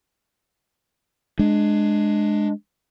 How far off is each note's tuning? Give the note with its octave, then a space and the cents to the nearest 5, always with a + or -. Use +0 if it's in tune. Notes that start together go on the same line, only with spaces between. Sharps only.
G#3 +10 D4 +20